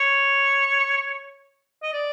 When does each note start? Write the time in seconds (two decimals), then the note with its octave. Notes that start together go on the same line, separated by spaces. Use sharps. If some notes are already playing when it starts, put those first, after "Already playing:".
Already playing: C#5
1.83 D#5
1.93 D5